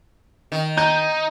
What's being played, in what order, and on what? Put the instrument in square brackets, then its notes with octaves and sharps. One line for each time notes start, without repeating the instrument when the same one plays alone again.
[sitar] D#3
[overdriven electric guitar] D#4 [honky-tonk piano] G6